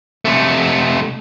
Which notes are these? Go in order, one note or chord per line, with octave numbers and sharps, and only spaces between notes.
C3 A3